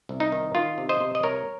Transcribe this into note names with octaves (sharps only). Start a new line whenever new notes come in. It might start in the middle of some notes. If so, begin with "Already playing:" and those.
C2
D#4
D#3
D#3 F4
C3
C5 D#5
C3
D#5
C2 A#4 C#5